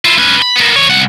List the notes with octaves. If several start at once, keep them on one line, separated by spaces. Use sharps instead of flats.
E4 F4
C#4 B4
B5
A#3 B3
E2 C#5
C2 F#5